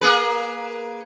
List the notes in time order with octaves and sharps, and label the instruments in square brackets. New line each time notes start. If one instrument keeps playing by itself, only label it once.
[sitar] A#3 G#4 B4